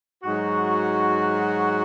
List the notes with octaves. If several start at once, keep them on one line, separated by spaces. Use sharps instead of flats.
G#2 F#3 D#4 F#4